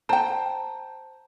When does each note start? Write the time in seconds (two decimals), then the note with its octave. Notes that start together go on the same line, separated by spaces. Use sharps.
0.09 C5 G5 A5 A#5